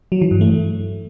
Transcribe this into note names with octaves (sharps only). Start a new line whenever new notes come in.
F#3
E3
G2
A3